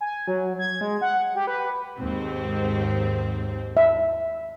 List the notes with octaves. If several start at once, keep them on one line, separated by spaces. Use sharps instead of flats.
G#5
F#3
G#6
G#3
F#5
G4
B4
D#2 G#2 C4
E5